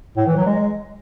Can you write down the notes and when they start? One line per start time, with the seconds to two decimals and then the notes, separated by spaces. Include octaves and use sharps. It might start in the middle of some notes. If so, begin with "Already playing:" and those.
0.17 A2
0.27 E3
0.37 F#3
0.46 G#3